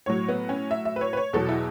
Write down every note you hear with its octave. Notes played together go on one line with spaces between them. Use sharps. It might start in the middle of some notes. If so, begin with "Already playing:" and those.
A2 F#3 C#5
B3
C#4
E5
E5
B4
C#5
B4
C#5
E2 B2 F#3 A4
E4